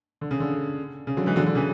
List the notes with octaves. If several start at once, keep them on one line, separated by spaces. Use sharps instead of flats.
D3
C#3
D3
C#3
D3 F#3
E3 G#3
D3 F#3
D3
C#3 E3